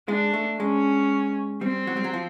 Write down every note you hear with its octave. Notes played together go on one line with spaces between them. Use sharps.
G#3 D4
A3
G#3 C#4
G3 C4
F#3
G3
F#3
F3